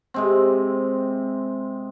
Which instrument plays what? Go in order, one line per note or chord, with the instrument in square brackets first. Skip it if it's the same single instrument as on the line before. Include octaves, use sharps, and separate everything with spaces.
[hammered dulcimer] C3 G#3 C4